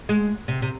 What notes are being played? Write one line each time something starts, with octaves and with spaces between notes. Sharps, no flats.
G#3
C3
C3